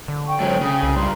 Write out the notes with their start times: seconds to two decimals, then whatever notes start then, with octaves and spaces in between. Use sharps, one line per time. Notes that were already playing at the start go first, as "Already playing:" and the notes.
0.08 D3
0.28 G5 C#6
0.40 G#2 F#3 G#4 C5 C#5
0.61 C#3 D#6
0.83 C2 F#4 A4 A#4
0.96 G2 F4 G4 A#5 C6